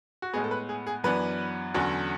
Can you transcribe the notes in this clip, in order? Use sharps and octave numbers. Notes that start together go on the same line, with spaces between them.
F#4
A2 G#3 B3 G#4
A4
B4
G#4
G#4
F#2 E3 B3 D4 B4
E2 D3 F#3 C#4